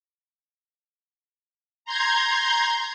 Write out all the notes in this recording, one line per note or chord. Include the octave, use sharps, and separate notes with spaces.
A#5 C6 G6 G#6